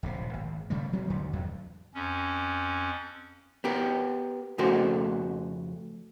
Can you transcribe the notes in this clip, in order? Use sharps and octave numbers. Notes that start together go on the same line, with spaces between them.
D1 A#1 C3
G#1
C#3 G3 A3
F#3 G3 C4
D#2 D3
E2 F#3
F2 C#4
B3 G4 A#4
F2 C#3 A3 F#4 A#4 C5